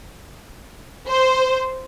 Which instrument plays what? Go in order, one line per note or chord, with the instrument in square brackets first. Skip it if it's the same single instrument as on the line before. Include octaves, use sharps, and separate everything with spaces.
[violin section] C5